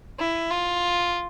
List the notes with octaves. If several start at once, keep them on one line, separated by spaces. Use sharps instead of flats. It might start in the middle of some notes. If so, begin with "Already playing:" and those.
E4
F4